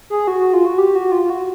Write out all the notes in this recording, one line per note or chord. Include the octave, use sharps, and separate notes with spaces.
G#4
F#4
F#4
F4
F#4
G4
F#4
F4
F4
F#4